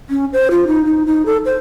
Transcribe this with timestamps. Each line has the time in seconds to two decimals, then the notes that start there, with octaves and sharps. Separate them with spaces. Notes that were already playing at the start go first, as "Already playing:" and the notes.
0.10 C#4
0.33 C5
0.51 F4
0.67 D#4
0.85 D#4
1.06 D#4
1.26 A4
1.45 C5